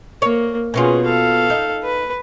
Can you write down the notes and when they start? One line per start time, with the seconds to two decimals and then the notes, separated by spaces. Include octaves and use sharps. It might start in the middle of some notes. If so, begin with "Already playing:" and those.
0.22 A#3 C#5
0.74 B2 B3 C#4 F4 G#4
1.05 A4 F5
1.50 D#4
1.84 B4